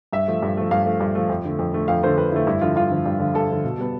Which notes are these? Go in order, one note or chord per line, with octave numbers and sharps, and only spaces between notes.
G2 E5
F3 A3
G2
F3 A3
G2 F5
F3 A3
G2
F3 A3
F2
D3 A3
F2
D3 A3
F2 F5
D3 A3 C5
F2 B4
D3 A3 E4
G2 E4
D3 F3 F4
G2 F4
D3 F3
G2
D3 F3
G2 A4
D3 F3
B2
G3 B3